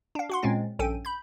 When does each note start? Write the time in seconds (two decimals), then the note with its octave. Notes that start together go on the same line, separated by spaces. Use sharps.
0.15 D4 F5
0.30 F#4 F#5 C6
0.43 A#2 G#3 C4 C#4 A6
0.79 A#1 G2 C#4 A4 G5 D#7
1.05 B5 G6